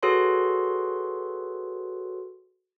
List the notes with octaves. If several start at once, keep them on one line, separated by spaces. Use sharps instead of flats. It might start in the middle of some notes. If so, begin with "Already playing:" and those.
F#4 G#4 A4 B4 C#5 C6